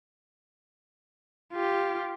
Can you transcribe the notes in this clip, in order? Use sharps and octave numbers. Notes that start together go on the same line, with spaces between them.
F4 G4